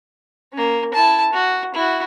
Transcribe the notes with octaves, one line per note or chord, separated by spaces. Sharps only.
A#3 C#4
E4 A5
F#4
E4 F#4